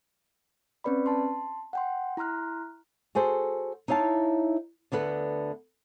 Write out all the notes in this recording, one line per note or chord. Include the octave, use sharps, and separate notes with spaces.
C4 C#4 B4 D5 B5
A5 C6
F#5 G5 C6
E4 A#5 C6 F6 F#6
F#4 G#4 A4 C5
D#4 E4 C#5 F5 A5
D2 D3 B3 B4